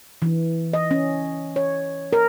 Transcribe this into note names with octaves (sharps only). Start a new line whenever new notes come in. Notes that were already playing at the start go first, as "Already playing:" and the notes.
E3
D#5
C#4
C#5
A#4